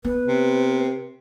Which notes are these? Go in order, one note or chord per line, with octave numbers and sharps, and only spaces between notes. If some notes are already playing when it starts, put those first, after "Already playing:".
B3 B4
C3